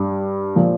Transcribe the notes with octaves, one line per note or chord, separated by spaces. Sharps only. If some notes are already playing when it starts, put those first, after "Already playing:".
Already playing: G2 G3
A#2 F3